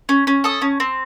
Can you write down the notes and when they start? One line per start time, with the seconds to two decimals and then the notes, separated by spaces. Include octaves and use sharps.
0.09 C#4
0.27 C#4
0.44 A4 D#6
0.62 C#4
0.80 C4